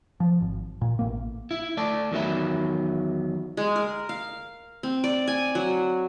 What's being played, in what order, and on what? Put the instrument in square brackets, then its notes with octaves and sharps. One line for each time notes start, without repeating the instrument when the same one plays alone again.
[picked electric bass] F3
G#1
A#2
A1 A#3
[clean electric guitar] E4
A3 D5 A5
E2 D#3 F#3 E5 B5
[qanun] G#3
A#4
F5
C4
D5
G#5
F#3